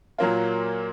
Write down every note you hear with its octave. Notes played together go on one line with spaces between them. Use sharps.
A#2 F#3 A#3 F4